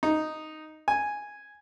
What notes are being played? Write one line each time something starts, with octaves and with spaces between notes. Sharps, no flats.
D#4
G#5